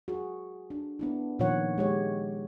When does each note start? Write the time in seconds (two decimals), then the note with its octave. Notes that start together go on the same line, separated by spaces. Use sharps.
0.08 F#4 G#4
0.70 D4
0.99 B3 D4 E4
1.39 A#2 D#3 F3 C#5 F#5
1.78 G#3 G4 C#5